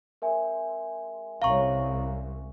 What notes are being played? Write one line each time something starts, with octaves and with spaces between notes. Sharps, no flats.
G#3 C4 A#4 E5 G#5
C2 C#4 C#5 F5 A#5 C#6